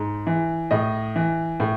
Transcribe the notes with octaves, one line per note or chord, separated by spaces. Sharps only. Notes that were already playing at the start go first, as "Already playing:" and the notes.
Already playing: G#2
E3
A2 D#5
E3
A2